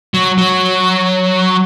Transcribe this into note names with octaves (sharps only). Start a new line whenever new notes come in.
F#3
F#3